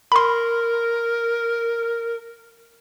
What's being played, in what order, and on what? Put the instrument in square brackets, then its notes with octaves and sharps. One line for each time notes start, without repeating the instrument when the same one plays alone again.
[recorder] A#4 [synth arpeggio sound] B5 C6